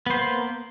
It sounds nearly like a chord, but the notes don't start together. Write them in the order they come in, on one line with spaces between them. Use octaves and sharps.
B3 C5 A#3